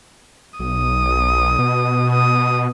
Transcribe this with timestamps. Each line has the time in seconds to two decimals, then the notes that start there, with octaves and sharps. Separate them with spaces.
0.60 B1 D#6
1.59 B2
2.12 D#6